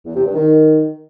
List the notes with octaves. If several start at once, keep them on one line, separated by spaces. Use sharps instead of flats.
E2
C3
G2
D#3